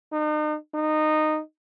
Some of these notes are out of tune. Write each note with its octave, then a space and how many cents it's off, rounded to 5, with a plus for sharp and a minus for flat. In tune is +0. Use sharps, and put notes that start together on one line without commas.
D#4 -40
D#4 -15